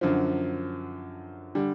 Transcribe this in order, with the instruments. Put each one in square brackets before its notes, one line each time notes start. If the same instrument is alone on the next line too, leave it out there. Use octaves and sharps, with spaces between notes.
[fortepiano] F#2 D3 F3
D3 G3